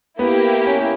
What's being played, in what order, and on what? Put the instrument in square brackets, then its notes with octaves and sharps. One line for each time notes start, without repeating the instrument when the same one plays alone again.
[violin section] A#3 E4 G4 [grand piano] B3
[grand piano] C#4